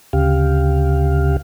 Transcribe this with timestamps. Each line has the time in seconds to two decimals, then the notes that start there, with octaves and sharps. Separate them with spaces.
0.13 D2 C#3 G4 F5